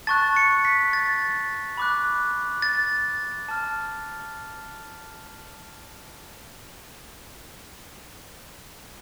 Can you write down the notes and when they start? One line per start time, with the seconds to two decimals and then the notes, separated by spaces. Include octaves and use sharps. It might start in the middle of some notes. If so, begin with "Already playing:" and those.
0.07 A5 C#6 F#6 A6
0.36 C#7
0.65 B6
0.93 A6
1.78 B5 D6 F#6
2.62 A6
3.49 A5 F6